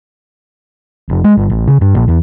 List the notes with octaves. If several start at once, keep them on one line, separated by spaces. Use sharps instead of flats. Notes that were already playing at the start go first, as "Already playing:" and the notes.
F1
G#3
G1
A1
C#3
G2
A#1
E2